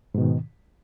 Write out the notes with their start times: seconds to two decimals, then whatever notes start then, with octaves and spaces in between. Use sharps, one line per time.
0.15 G#2
0.18 B2
0.21 D#3